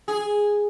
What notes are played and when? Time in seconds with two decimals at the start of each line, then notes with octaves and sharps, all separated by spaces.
0.08 G#4